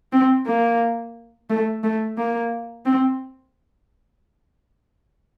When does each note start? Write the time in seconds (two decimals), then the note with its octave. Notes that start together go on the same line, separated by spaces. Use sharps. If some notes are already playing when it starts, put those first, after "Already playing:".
0.12 C4
0.46 A#3
1.50 A3
1.83 A3
2.18 A#3
2.85 C4